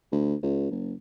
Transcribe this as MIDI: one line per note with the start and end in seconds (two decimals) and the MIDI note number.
0.12 0.35 38
0.43 0.68 37
0.71 0.93 30